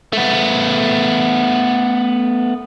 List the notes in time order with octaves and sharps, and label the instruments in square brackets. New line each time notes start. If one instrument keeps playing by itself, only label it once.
[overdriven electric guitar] A3 B3